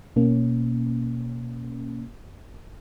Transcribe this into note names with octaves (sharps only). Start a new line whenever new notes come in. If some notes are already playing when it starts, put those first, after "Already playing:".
B2 A#3 C#4